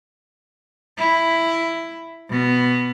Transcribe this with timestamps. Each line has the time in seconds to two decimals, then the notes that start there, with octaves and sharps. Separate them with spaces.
0.98 E4
2.29 B2 B3